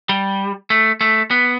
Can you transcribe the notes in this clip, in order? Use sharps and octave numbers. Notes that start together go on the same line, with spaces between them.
G3
A3
A3
B3